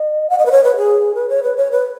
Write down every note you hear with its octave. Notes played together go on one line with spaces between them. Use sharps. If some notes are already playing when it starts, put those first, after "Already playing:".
Already playing: D#5
F#5
D#5
B4
C#5
B4
G#4
B4
C#5
B4
C#5
B4